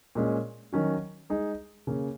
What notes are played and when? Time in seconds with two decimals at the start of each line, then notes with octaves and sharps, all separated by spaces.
0.15 A#2 G#3 C#4
0.73 D#3 F#3 C#4 F#4
1.30 G#3 D#4 G#4
1.87 C#3 A#3 C#4